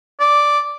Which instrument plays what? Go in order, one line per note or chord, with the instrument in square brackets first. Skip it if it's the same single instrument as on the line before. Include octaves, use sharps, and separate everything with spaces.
[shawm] D5